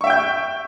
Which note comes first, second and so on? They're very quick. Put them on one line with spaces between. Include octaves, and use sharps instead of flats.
C#6 E5 G5 G6